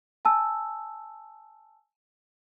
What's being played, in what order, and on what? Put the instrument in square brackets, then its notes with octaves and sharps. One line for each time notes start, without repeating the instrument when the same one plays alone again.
[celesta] G#5 A5 E6